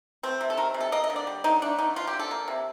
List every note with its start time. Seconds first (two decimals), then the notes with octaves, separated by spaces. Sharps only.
0.23 A3 C4
0.41 C3
0.50 A4
0.57 D#3 A#4
0.74 C3
0.81 A4
0.92 A#3 D#5
1.04 D#5
1.10 D3
1.16 D5
1.27 G3
1.44 D3 D#4
1.62 A3 D4
1.78 D3 D#4
1.96 F3 F4
2.07 G4
2.13 D3
2.19 A4
2.31 A#3
2.48 C3